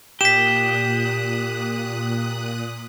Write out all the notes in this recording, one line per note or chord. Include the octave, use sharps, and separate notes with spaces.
A#2 G4 D#6 F#6 B6 E7